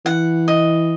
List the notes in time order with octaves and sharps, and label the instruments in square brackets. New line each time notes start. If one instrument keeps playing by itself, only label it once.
[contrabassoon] E3 [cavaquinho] F#5
[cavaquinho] D#5